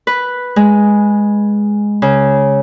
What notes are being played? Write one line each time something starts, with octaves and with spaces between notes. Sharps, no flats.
B4
G#3
C#3